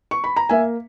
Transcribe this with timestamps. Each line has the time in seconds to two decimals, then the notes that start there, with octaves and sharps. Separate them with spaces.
0.11 C#6
0.24 B5
0.36 A#5
0.49 A#3 E5 G#5